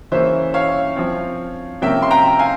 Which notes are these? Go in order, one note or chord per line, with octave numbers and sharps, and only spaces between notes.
C#3 E3 A#3 C#4 C5 E5
C#5 F5
F3 C4
C3 F3 A#3 C#4 E5 G5
C6
G5 A#5
F5 G#5